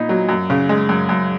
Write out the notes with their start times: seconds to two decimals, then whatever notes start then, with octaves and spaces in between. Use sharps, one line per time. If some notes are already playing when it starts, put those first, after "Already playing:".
Already playing: A#2 B3 D#4
0.09 F#3
0.29 F#2
0.50 C#3
0.69 G#3
0.89 F#2
1.09 F#2